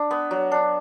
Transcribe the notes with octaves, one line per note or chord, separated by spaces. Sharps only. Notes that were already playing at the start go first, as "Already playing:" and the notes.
Already playing: D4
B3
F#3
D4